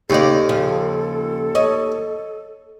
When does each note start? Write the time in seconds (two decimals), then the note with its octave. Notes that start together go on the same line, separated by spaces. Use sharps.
0.10 D#2 C#3 D#4 A4 D5
0.49 C#3 F3
1.55 C#5 D#5